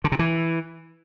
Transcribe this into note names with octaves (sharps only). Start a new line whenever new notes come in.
D3
C3
E3